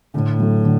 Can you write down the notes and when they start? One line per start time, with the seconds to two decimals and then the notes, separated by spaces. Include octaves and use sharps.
0.14 A2 D3
0.39 F#3 A3
0.64 D3